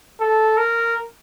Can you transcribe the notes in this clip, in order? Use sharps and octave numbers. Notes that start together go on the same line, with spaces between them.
A4
A#4